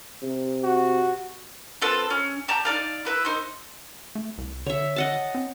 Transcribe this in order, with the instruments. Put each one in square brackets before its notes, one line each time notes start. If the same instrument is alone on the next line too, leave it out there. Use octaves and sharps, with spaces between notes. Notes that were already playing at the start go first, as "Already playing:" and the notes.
[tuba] C3
[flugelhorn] F#4
[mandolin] C4 F4 A4 B4
C#4
G4 A5 A#5 G6
D#4 A#4 D5 F5
E4 B4 E5
D#4 A#4 C5
[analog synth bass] A3
C2
[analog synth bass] D3 [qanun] C#5 E5
[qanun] D#5 F#5 A5
[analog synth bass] C4